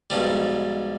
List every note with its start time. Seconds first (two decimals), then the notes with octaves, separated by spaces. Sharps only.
0.10 B1 G#2 F3 G3